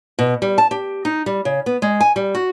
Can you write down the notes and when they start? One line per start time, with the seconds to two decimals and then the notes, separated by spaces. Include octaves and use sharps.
0.19 B2
0.42 G3
0.58 A5
0.71 G4
1.05 D#4
1.26 G3
1.45 C#3
1.66 B3
1.82 G#3
2.00 G#5
2.16 G3
2.35 F#4